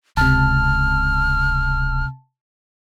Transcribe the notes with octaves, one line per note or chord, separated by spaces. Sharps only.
D1 C#2 C3 A5 F6